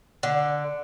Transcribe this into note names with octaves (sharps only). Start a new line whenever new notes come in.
D3